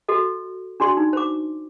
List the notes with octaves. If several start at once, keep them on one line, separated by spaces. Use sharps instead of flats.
F#4 A4 D#5
D4 F#4 D5 C6
D#4
C5 D6